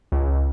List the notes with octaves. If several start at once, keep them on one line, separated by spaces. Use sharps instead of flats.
C#2